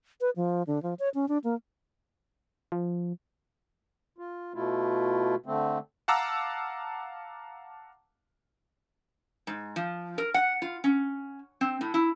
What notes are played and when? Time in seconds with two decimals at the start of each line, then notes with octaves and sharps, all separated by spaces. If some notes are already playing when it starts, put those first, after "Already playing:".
0.21 B4
0.36 F3
0.67 D3
0.83 F3
0.99 C#5
1.15 C#4
1.28 D4
1.44 A#3
2.72 F3
4.18 F4
4.54 B2 A3 E4 F4
5.46 D3 A3 C4
6.08 F5 F#5 A5 A#5 D6 E6
9.47 G#2
9.76 F3
10.18 A#4
10.34 F#5
10.62 F4
10.84 C#4
11.61 C4
11.81 A2
11.94 E4